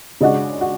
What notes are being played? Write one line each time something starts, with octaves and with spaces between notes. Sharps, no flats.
C#3 G#3 D4 F#4
F#4